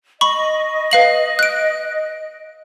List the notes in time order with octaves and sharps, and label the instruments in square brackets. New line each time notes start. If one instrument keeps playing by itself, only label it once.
[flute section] D#5 [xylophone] B5 C#6
[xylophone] B4 F5 F#7
F#6 D7